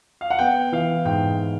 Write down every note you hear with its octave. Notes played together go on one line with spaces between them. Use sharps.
F5
F#5
B3 G5
E3 F5
G#2 G5